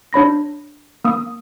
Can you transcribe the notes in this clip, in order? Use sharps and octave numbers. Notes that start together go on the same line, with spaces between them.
D4 C#5 B5 A#6
A#3 D#6